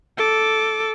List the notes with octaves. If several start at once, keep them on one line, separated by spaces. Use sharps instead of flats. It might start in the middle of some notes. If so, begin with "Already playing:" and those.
A4 D6